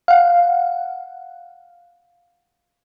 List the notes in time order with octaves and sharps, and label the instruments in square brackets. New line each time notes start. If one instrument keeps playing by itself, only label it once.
[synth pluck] F5 F#5